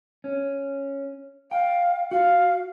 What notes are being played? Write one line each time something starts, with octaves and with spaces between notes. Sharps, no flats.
C#4
F5 G5
F#4 F5